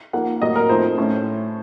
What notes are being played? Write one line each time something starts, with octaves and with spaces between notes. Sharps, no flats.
F3 A#3 D#4 F#5
A2 F#3 A#3 D#5
A#4
F3 A3 C4 D#4 C5
A2 A3 C#4